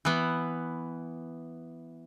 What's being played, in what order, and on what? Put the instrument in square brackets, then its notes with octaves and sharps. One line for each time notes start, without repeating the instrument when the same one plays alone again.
[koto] E3 B3